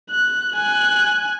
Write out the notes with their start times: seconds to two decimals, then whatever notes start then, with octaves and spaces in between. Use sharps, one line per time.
0.10 F#6
0.55 G#5 F#6